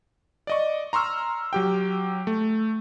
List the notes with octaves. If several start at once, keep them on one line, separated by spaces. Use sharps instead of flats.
D5 D#5 C#6
A#5 C6 C#6 E6 F6
F#3 G4 G5
A3